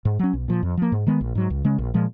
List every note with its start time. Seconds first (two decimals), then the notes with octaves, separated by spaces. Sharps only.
0.05 G#2
0.19 F#3 C#4
0.33 B1
0.48 A#2 F3
0.63 F2
0.77 F3 A#3
0.92 G#2
1.07 D#3 G#3 B3
1.21 A#1
1.35 G#2 F#3
1.50 C#2
1.64 C#3 G#3 C#4
1.78 A#1
1.94 A#2 F3 G#3